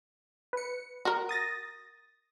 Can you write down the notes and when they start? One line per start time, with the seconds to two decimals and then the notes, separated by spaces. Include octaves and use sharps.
0.53 B4 C#7
1.05 F#4 A#4
1.29 D#6 A6 A#6